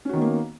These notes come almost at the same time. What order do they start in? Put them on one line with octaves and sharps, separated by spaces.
C#4 F#4 D#3 B3 A#3